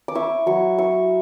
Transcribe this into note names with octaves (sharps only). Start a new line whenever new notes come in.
D6
E4 C#6
F#3 C#6
E4 C#6